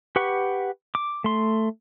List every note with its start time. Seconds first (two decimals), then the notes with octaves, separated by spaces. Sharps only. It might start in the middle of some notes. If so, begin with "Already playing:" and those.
0.16 G4 B4 F#5 C#6
0.95 D6
1.24 A3 C6